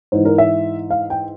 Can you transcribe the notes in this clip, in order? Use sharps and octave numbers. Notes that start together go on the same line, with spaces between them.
G#2 E3 C5
A#4
E5
F5
G5